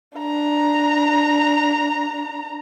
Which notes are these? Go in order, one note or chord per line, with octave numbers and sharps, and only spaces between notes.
D4 A#5